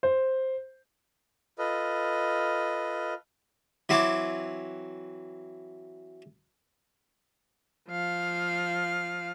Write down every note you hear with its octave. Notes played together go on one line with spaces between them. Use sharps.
C5
F4 A4 B4 D#5
E3 F#3 C4 D6
F3 F5